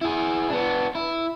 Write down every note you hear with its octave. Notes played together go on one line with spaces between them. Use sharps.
E4 G#4
B3 D4
E4